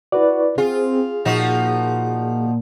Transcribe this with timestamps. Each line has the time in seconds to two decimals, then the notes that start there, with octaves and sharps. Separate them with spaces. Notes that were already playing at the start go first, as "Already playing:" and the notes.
0.12 E4 F#4 B4 D5
0.58 C4 F4 G#4
1.25 A#2 F3 D#4 F#4